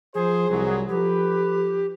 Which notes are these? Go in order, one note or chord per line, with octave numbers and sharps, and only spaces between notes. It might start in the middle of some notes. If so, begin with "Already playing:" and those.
F3 G#4 C5
C2 F#3
F3 G4 A4 B4